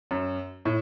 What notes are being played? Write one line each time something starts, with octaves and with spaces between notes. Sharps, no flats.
F#2
A2